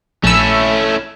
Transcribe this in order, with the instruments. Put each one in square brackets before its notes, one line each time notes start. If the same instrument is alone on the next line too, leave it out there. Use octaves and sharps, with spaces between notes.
[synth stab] A#1 E6 [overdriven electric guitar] A3 [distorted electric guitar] C#4 E4